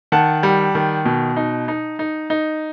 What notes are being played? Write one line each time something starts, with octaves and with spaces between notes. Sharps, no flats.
D#3 F#5 A5
G3
D#3
B2
D#4
D#4
D#4
D#4